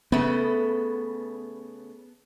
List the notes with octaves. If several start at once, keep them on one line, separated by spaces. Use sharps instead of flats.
C#3 A3 B3